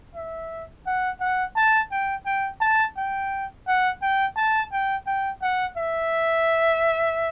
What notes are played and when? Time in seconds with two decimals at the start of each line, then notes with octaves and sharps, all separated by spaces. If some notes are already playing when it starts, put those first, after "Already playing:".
0.15 E5
0.86 F#5
1.21 F#5
1.56 A5
1.91 G5
2.26 G5
2.61 A5
2.97 G5
3.67 F#5
4.02 G5
4.37 A5
4.72 G5
5.07 G5
5.42 F#5
5.78 E5